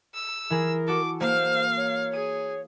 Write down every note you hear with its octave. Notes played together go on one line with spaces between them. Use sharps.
E6
E3 G#4 A#4
F#4 A4 D6
A#3 C5 F5
C#5
G#4 D#7